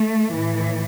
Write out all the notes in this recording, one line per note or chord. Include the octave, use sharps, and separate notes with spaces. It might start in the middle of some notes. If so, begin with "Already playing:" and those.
Already playing: A3
A2 E3